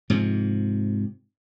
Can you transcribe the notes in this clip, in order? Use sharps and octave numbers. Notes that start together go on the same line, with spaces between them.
G#2 C3 F3